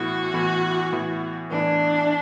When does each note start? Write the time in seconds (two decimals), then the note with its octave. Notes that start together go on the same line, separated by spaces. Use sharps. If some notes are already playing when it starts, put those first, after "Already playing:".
Already playing: A2 E3 B3 E4 F#4
0.34 A2 E3 B3 E4
0.92 A2 E3 B3 E4
1.51 A2 E3 B3 D4 E4